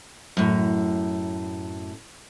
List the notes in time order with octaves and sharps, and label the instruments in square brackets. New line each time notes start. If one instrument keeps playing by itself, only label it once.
[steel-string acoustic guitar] F#2 A2